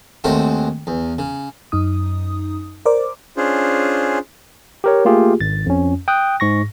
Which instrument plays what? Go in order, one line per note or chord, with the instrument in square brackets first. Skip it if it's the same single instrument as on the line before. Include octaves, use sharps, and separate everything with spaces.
[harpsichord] D#2 G#3 A3 C4 F#4
E2
C#3
[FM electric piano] F#2 D#4 D#6
A#4 C5 D5 D6
[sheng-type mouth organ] C#4 D4 F4 G#4 C5
[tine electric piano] G4 A#4 C#5
A3 A#3 F4 G4 G#4
G#1 A6
F2 C#4
G5 D#6 F#6
G#2 C#6 A#6